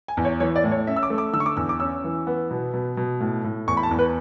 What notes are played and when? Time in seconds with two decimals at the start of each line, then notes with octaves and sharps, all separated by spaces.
0.08 G#5
0.17 E2
0.25 C#5
0.40 E3 C#5
0.56 D5
0.64 A2
0.72 C#5
0.87 C#4 E5
0.96 E6
1.03 D6
1.10 A3
1.18 D6
1.33 D3 E6
1.40 C#6
1.46 D6
1.57 E2 E6
1.69 D6
1.80 C#4 E6
2.04 E3
2.27 B3
2.51 B2
2.73 B2
2.97 B2
3.20 A2
3.44 A2
3.68 E2 C#6
3.77 B5
3.83 A5
3.91 E2
3.99 B4